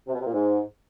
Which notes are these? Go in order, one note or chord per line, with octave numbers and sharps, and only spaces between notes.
C3
B2
C3
A#2
G#2